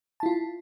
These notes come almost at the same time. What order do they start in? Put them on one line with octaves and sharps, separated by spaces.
A5 E4 F4